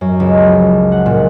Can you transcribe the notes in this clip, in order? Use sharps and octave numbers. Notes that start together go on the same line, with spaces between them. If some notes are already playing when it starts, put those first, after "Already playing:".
F#2
C#2
F3
F#5
A#2